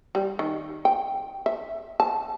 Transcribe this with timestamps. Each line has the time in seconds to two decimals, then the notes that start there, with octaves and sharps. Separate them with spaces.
0.15 G3
0.39 D#3
0.85 G5
1.46 E5
2.00 A5